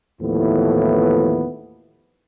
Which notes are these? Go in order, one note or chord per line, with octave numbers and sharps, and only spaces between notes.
D#2 A2 E3 F3 B3